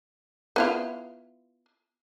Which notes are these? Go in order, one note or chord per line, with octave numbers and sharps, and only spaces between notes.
B3 E4 F4